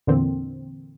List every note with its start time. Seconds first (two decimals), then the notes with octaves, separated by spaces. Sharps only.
0.07 E2 A#2 D3 E3 A#3 C4